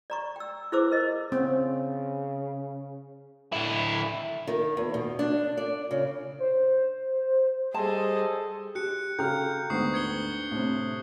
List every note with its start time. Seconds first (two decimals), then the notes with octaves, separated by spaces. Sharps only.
0.10 D5 A#5 C#6
0.36 G5 E6
0.72 E4 G#4 B4 C5 D6 E6
0.92 A#4 D#5
1.32 C#3 C4
3.53 D3 E4
4.47 D#3
4.77 E2
4.94 B2
5.19 D4
5.57 D5
5.91 C#3
6.39 C5
7.74 G3 G#4 A4 C5 D#5 A5
8.75 G4 F#6 C#7
9.19 C#3 F#4 A4 G5 A#5 F6 G6 C#7
9.70 D2 G#2 B3 C#6 D#6 C7
9.94 D4 G#6 C#7 G7
10.52 A2 C3